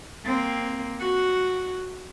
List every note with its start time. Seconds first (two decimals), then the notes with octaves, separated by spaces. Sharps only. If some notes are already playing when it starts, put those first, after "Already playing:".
0.25 A#3 C4
1.01 F#4